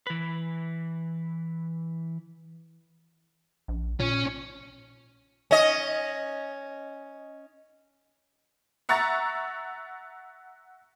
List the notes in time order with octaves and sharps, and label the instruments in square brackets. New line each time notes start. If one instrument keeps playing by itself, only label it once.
[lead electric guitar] E3 B4
[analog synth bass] A#1
[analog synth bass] A#2 [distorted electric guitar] C#4
[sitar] C#4 D#5
[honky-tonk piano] E5 F#5 A#5 C#6 A6